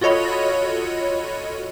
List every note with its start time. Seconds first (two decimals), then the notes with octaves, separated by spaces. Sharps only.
0.01 F4 F#4 A4 C#5 D#5 B5